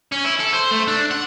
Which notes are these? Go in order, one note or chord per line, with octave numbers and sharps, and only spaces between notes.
C#4
E4
A4
C5
A3
D4
F#5